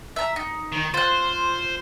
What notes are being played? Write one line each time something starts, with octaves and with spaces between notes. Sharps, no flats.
E5 A#5
D#4
D#3
F4 C5 F#6